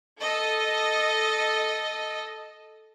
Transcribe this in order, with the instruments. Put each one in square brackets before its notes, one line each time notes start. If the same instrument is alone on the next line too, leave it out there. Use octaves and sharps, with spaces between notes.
[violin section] A4 D#5